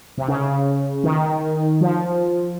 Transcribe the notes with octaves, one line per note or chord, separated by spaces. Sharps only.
C3
C#3
D#3
F3